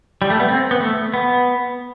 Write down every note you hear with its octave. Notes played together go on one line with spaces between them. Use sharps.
G3
A3
B3
C4
B3
A3
B3